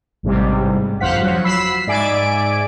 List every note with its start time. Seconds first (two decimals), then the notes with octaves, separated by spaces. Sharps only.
0.23 A1 G#2 C3 G3
1.01 G1 F2 C5 F5 F#5 B6
1.22 F3 F#3 F#4
1.44 B5 E6 B6 C7
1.87 G#2 D5 E5 G#5 D7